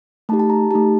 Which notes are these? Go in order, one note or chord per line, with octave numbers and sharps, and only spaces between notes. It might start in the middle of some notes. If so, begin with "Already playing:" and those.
A3 D#4 G4 A5
A5
A#5
A3 D#4 G4 A5